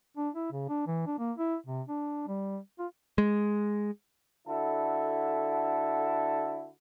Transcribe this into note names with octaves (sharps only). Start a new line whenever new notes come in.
D4
E4
C#3
D4
E3
D4
A#3
E4
C3
D4
G3
F4
G#3
D3 E4 F#4 A4